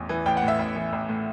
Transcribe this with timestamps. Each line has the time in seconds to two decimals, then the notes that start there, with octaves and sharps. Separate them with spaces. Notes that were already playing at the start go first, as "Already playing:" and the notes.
Already playing: A1 E2
0.09 E3
0.26 A1 G5
0.37 F#5
0.43 A2
0.48 E5
0.59 A1
0.76 E3
0.93 A1
1.09 A2